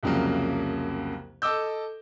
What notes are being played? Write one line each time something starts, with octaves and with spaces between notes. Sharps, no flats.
C2 F2 C#3 F#3 A#3
A4 D#5 D6 E6 G6